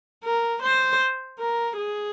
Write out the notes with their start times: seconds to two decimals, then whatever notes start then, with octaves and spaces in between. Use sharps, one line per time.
0.24 A#4
0.63 C5
1.39 A#4
1.77 G#4